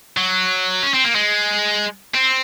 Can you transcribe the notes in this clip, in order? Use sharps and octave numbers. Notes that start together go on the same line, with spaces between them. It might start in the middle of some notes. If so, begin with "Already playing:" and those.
F#3
C#4
C4
A#3
G#3
C4